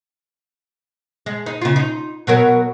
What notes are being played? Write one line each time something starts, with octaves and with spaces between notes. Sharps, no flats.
G#3
D#4
C#3 F4
D#4
B2 F#3 A#4